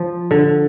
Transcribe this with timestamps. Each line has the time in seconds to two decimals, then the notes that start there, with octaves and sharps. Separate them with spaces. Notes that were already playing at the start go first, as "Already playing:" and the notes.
Already playing: F3
0.31 D3